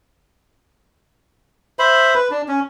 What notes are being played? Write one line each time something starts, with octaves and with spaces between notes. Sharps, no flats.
C5 E5 B5
B4
D4
C#4